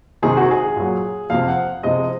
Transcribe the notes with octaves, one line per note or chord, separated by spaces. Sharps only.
C3 D#3 G#3 G#4
F#4
G#4
A#2 F#3
F2 C3 F3 F5
F#5
C3 F3 G#3 D#5